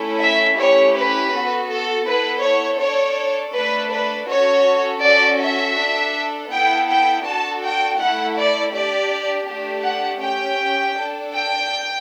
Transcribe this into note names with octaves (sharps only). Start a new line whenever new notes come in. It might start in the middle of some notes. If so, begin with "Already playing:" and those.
Already playing: A3 C#4 E4 A4
E5
A3 C#4 E4 G4 C#5
B4
B3 F#4 A4
A4
B3 E4 A4 B4
C#5
D4 A4 C#5
A3 D4 A4 B4
B4
C#4 F#4 A4 C#5
C#4 F#4 A4 D5
E5
D4 A4
B3 E4 A4 G5
G5
D4 F#4 A4 A5
G5
A3 E4 A4 F#5
D5
D4 G4 D5
A3 D4 G4
F#5
C#4 G4 G5
D4 A4
G5